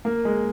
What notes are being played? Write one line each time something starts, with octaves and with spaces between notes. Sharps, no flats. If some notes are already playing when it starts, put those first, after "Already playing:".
A#3
G#3